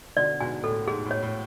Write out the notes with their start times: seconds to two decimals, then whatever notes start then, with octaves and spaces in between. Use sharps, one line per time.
0.17 B2 D3 D5
0.40 G#2 B2 G#5
0.63 A2 A4
0.87 G#2 G#4
1.05 A2
1.11 C#5
1.22 A2